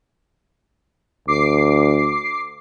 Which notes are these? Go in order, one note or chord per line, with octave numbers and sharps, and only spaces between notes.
D2 D6 C7